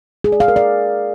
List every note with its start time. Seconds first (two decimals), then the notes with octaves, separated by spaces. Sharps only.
0.24 G#4
0.32 D5
0.40 F5
0.48 A#4
0.56 D5